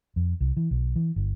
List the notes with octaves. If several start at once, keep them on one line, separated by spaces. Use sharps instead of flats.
F2
C2
E3
B1
E3
G1